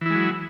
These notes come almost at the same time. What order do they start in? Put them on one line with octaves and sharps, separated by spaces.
E3 E4 G#3 F#3